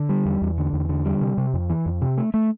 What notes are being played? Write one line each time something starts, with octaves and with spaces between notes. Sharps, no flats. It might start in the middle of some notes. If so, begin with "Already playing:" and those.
Already playing: D3
G3
E2
E2
D3
E2
D3
G3
C3
C3
F2
E3
F2
C3
A3
A3